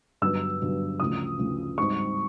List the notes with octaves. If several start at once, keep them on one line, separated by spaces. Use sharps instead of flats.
G2 D3 F#3 B3 E6
G2 D3 F#3 B3
D2 C#3 F3 D#6
D2 C#3 F3
G#2 D#3 G3 C4 C#6